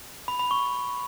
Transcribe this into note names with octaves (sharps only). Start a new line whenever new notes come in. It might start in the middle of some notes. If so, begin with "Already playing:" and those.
B5
B5
C#6